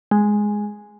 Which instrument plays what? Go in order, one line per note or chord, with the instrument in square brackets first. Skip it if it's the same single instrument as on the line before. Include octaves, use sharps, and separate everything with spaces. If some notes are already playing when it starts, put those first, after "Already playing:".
[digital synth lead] G#3